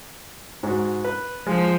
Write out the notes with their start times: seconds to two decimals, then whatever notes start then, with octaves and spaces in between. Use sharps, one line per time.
0.63 G#2 F#4
1.04 B4
1.47 F3 G#3